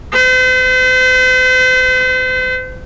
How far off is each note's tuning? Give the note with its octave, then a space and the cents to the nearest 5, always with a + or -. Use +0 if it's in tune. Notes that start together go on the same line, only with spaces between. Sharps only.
C5 -40